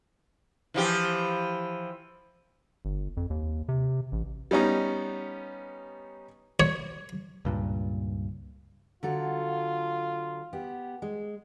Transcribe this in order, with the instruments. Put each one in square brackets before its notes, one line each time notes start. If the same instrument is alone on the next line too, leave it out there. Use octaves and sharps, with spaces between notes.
[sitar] E3 F3 G4
[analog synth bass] G1
F2
D#2
C3
A1
[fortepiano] G3 B3 C#4 D#4
[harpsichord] C#5
[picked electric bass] C#2 G2 A#2
[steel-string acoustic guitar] D3 F#3 A4 [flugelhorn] F4
[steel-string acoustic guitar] B3 G4
G#3